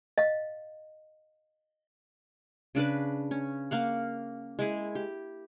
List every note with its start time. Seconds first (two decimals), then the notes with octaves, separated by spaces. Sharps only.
0.18 D#5 F5
2.75 C#3 D4 B4 D6
3.31 C#4
3.71 A#3 F5 F#5
4.59 G#3 E4 G#4
4.95 G4